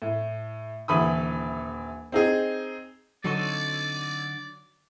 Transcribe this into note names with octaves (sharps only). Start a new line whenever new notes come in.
A2
D#1 D3 E3 B5 D#6
C4 D#4 G#4
D3 F#3 C4 D#4 A4 D5 C#6